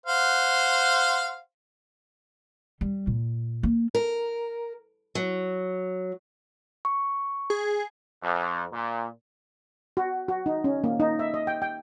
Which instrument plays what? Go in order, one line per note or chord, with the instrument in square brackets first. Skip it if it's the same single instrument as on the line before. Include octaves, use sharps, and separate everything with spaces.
[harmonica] C5 F5 F#5
[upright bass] G3
A#2
A#3
[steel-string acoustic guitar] A#4
F#3
[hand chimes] C#6
[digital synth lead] G#4
[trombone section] F2
A#2
[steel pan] F#4
F#4
D#4
C#4
A#3
D#4
E5
D#5
G5
G5